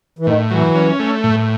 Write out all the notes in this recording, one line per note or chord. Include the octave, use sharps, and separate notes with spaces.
E3
A2 D#3
E3 F#3
C#4
A3
A2